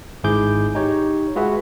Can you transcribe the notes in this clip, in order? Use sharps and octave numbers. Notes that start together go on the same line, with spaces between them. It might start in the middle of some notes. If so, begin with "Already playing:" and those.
G#1 G#2 E4 G#4 D6 G6
D#4 G4 C#5
G#3 F4 F#4 G#4 B4 E5